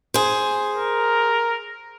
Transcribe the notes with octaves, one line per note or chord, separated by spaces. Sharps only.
G#4 C5
A#4